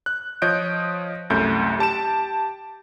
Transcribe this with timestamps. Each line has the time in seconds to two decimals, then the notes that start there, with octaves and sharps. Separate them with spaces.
0.06 F#6
0.42 F3 C#5 D#5 G6 D7
1.30 C2 F#2 A3 G6
1.79 G4 A5 D7 E7